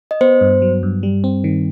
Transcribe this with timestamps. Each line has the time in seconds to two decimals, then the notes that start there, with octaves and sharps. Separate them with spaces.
0.11 D#5
0.21 B3 C5
0.41 G2
0.62 F#3
0.83 G2
1.03 G3
1.24 C4
1.44 D#3